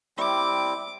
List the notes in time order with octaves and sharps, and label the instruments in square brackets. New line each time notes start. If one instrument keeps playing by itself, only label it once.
[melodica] G3 C4 E4 [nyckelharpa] D6